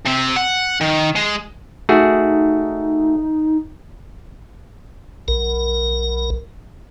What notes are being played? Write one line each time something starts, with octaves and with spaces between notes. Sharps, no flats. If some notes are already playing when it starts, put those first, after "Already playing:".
C3 C4
F#5
D#3
G#3
A3 D#4 F#4 G#4
B1 A#4